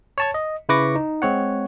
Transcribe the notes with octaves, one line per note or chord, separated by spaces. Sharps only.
C#5 A5 C#6
D#5
C#3 E4 B4 C#6 D6 A#6
D#4
G#3 C4 C#5 F#5